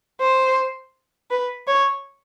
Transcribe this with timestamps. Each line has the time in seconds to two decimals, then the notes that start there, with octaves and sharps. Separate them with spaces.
0.21 C5
1.31 B4
1.67 C#5